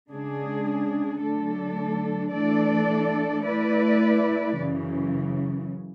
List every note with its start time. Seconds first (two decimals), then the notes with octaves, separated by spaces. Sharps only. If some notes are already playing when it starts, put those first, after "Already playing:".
0.11 C#3 G#3 D4 G#4
1.23 D3 F#3 A3 D4 A4
2.34 E3 A3 D4 A4 D5
3.46 A3 E4 B4 D5
4.58 F#2 C#3 E3